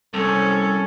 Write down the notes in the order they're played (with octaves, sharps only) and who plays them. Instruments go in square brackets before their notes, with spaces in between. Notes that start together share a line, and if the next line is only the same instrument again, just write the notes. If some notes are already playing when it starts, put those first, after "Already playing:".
[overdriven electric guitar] C2 [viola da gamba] C#4 [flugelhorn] A4